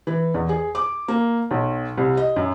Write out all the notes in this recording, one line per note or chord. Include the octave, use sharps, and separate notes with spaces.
E3
E2
G#4
D6
A#3
B1
C2
D#5
F#2